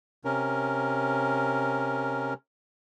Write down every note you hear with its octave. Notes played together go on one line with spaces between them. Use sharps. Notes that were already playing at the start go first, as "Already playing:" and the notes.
C3 C#4 A#4